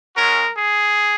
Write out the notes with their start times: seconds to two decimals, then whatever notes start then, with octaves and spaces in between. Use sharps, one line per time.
0.16 G#3 C#4 F#4 A#4
0.56 G#4